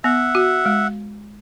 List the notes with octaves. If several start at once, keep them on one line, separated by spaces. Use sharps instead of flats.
B3 E5 F#5
F#4
G#3